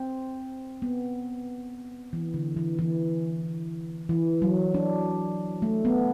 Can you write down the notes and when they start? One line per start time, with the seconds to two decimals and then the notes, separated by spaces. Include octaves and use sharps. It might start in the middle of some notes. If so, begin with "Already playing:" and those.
Already playing: C4
0.82 B3
2.13 E3
2.34 D3
2.57 E3
2.79 E3
4.09 E3
4.42 F#3
4.74 D4
5.62 A3
5.85 B3